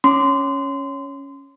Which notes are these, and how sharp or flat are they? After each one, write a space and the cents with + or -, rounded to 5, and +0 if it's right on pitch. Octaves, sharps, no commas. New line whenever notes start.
C#4 +0 C6 -25